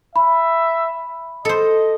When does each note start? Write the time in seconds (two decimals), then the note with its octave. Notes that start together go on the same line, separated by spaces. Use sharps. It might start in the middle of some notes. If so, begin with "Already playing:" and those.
0.16 E5 B5
1.45 A4 C5 D#5